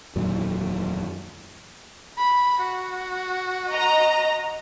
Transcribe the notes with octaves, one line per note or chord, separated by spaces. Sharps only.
E1 F#2 A#2 D#3
B5
F#4
D#5 A#5